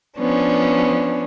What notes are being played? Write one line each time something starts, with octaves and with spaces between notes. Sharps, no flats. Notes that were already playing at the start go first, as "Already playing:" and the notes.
F3 B3 C#4 D4